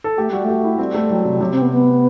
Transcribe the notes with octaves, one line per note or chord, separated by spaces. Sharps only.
A4
A3 G4
G3 F#4
A3 G4
E4
G3 C4
A3
F#3
C3
C3 F#3
C4
B3
B3